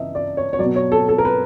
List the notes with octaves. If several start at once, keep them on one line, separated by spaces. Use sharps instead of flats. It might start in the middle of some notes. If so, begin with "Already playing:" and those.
Already playing: C#3 E3 D#5 E5
D5
C#5
C#5
F#3 D5
B2
C#5
A4
A4
A#4
B4